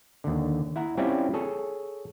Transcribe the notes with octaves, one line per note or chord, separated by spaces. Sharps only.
D#2 D3
E4 F#5 A#5
G3 C4 C#4 E4 F4 D5
G#4 A4 C#5